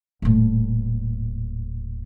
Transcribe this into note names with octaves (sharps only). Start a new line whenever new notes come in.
D#1 A2